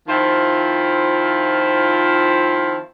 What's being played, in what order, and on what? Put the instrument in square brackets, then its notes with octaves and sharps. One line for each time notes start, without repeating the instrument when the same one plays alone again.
[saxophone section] D#3 F3 C4 E4 F4 C5